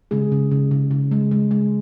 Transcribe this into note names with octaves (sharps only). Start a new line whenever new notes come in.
C#3 G#3 G#4
C#3
C#3
C#3
C#3
G#3
G#3
G#3